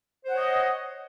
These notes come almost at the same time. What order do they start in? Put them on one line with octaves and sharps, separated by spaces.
C5 F#5 C#5 D#5